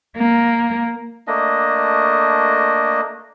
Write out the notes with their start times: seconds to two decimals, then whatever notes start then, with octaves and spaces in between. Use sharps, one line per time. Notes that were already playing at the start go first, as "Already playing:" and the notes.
0.17 A#3
1.27 A3 A#3 D4 D#5